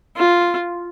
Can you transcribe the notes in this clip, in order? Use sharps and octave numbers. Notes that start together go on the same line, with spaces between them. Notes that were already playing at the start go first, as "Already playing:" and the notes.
F4